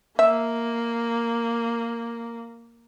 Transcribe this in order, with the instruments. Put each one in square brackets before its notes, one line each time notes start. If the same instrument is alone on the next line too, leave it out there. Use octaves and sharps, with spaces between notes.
[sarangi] A#3 [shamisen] E5